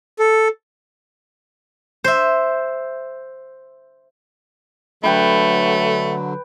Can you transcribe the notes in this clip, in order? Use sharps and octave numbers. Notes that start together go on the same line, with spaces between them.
A4
C5 E5
D3 F#3 A3 B4 G5 B5